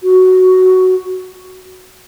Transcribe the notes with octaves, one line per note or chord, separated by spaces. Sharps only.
F#4